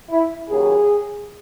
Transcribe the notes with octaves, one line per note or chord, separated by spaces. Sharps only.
E4
D#2 C#3 F#3 G#4